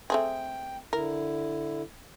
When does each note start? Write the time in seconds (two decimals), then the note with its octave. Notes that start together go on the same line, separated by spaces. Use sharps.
0.10 A3 C4 G#4 G5
0.93 D3 E4 A#4